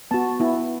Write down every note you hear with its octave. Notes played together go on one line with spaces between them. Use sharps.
B3 F#4 A5
B3 E4